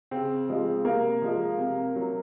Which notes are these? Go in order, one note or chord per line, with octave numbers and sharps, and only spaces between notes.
C#3 C4
F3 G#3
C3 A#3
F3 G#3
C3
F#3